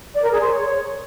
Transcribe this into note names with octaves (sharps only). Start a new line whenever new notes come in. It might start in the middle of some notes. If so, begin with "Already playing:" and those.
D5
A#4
G#4
C5
C#5